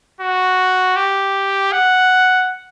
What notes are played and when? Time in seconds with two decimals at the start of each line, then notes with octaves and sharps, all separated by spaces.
0.21 F#4
0.96 G4
1.72 F#5